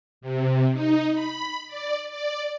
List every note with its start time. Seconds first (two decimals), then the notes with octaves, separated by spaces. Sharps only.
0.21 C3
0.73 D#4
1.13 B5
1.68 D5
2.11 D5